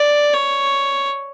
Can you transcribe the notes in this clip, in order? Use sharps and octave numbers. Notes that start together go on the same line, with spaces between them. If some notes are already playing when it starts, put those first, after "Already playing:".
Already playing: D5
C#5